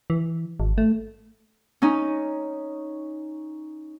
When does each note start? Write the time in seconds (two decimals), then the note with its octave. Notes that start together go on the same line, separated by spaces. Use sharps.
0.10 E3
0.60 G#1
0.78 A3
1.82 C#4 D#4